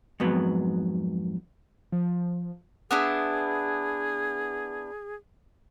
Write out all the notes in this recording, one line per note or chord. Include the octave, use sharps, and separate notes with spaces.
F2 G#2 F#3 B3
F3
B3 D4 E4 G#4